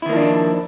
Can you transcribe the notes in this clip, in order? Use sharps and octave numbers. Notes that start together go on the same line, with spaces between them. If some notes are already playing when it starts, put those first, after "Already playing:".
D#3 F3 A#3 D4 E4